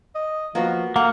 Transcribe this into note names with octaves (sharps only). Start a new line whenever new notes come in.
D#5
F3 A#3 B3 F#4
A3 A#3 F#5